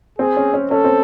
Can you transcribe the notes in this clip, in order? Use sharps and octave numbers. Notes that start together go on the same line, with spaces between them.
C4 G#4
C#4
C#4
C#4 A4
C4